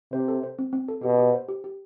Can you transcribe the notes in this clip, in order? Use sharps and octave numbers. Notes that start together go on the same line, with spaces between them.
C3 C5
A4
C5
C4
C4
A4
B2 G4
G4
C5
G4
G4